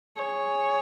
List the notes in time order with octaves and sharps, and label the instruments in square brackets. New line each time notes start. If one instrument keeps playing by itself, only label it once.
[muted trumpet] G#4 [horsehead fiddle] C#5